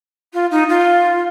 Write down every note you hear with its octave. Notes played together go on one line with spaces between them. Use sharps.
F4
D#4
F4